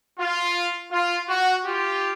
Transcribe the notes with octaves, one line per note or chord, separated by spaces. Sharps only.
F4
F4
F#4
F4 G4